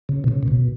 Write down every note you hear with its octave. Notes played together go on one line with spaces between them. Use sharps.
C#3
B2
C#3
A#2
B2